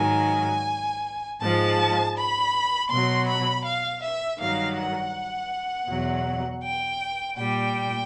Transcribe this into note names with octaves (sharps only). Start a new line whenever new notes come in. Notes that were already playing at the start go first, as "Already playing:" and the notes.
Already playing: G#2 D#3 F#3 G#5
G#2 F3 G#3 A5
B5
B2 F#3 C6
B5
F5
E5
G2 D#3 F#3 F5
F#5
E2 B2 F#3
G5
A#2 G3 G5